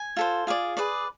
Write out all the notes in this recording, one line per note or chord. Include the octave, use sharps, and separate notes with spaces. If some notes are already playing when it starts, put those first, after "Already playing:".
Already playing: G#5
F4 A4 C5
F4 G#4 D5
G#4 B4 D5